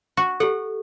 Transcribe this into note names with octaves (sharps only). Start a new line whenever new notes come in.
F#4
G4 A4 F#5